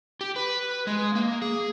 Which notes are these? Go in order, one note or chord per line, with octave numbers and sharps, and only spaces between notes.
G4
B4
G#3
A#3
G#4